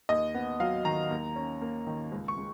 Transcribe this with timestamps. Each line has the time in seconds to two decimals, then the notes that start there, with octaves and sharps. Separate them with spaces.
0.09 D#2 D#5
0.35 B3
0.60 F#3 F5
0.85 D#3 A#5
1.11 D#2
1.36 C#4
1.61 A#3
1.87 D#3
2.12 C#2
2.28 C#6
2.37 G#3